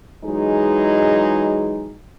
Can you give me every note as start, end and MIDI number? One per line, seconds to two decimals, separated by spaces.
0.25 1.96 52
0.25 1.96 54
0.25 1.96 56
0.25 1.96 63
0.25 1.96 68